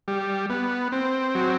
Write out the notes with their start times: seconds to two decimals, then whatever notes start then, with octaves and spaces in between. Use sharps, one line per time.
0.08 G3
0.50 B3
0.92 C4
1.35 F#3